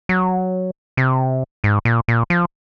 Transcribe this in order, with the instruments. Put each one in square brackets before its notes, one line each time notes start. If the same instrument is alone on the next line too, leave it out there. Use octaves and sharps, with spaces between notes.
[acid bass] F#3
C3
G#2
A#2
A#2
F3